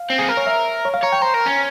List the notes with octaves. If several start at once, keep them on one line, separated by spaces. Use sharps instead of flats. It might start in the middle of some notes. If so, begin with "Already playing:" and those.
Already playing: F5
C4
G#4
A#4
C#5
E5
C#5
F5
C#5 A#5
G5
C5 A#5
A#4
C#4